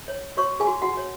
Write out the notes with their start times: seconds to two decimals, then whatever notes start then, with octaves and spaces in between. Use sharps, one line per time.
0.08 C#5
0.37 F#4 C#5 C#6
0.60 G#4 G#5
0.67 F#4
0.82 F#4 F#5
0.97 C#5